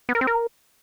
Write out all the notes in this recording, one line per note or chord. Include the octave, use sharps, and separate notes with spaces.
B3
A#4
C4
A#4